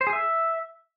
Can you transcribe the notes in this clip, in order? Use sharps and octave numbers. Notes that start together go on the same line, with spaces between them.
C5
G#4
E5